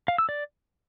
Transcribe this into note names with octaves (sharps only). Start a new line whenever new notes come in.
F5
E6
D5